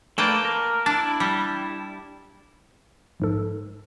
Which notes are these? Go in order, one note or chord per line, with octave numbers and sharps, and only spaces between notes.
A3 A#3 B4 D5 G5 A5
A#4
D4 E4 A5
G3
A#1 G#2 A4